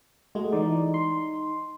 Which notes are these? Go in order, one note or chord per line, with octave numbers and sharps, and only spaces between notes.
G#3 A3 F#4
E3 D#4 D5
C6